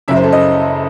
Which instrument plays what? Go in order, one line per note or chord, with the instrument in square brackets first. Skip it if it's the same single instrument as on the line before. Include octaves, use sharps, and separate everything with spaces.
[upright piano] F#1 F#2 C#3 E5
C5
A4
D#5